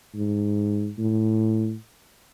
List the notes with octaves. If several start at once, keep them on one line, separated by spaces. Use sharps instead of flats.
G#2
A2